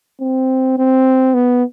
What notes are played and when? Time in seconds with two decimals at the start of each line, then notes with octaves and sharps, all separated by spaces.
0.21 C4
0.78 C4
1.34 B3